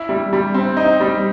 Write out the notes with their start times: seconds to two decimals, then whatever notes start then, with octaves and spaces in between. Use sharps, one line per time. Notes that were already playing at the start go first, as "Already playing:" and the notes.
Already playing: E4
0.09 G3
0.33 G3
0.54 C4
0.77 D#4
1.00 G3